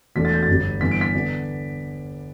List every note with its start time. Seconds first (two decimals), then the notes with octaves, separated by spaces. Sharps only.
0.15 E1 E2 B2 A3 D4 B6
0.25 A6
0.34 G6
0.43 A6
0.48 G1 G2 D3 G3
0.81 G1 G2 E3 B3 D4 B6
0.91 D7
1.01 B6
1.14 D3 B3 D4